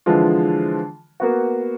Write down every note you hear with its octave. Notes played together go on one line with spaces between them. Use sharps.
D3 E3 F3 G#3 F4
A#3 B3 F#4